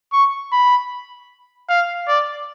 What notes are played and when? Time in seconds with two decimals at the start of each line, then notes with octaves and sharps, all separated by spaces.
0.12 C#6
0.52 B5
1.69 F5
2.08 D5